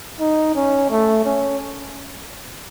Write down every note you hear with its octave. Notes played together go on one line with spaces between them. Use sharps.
D#4
C#4
A3
C#4